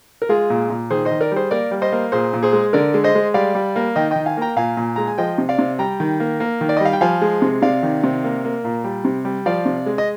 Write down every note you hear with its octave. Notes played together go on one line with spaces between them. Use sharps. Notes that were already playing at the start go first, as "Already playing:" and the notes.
A#4
G#3 F4 G#4
A#2
A#2
D#3 G#4 C5
C5 D#5
D#3
A#4 D5
G3 G#4 C5
A#3 A#4 D5
G3
C5 D#5
A#3
A#2 G#4 C5
A#2
G#4 C5
G#3
D3 A#4 D5
G#3
C5 D#5
G#3
G3 D5 F5
G3
A#3
D#3 D#5 G5
D#3 D#5 G5
F5 G#5
A#3 G5 A#5
A#2 F5 G#5
A#2
G#3 A#5
G#5
F3 D#5 G5
C3
D5 F5
C3
G3 G5 A#5
D#3
A#3
A#3
D#3
D5
D#5
G3
F5
G5
F3 F5 G#5
G#3
C3
C3 D5 F5
D#3
C3
A#3
A#3
A#2
G3
C3
G3
F3 D5 F5
C3
G#3
D#5